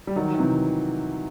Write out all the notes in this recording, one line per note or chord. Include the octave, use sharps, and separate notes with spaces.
G3
D#3 F#3
D#3
C3 E3